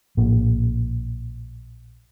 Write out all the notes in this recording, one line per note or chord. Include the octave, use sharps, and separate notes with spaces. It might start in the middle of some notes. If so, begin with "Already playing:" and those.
A#1 A2 A#3